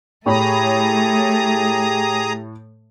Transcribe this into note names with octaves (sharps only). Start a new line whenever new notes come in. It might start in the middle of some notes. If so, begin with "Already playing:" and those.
A2 A3 G4 G#4 C#5 A#5 B5 D#6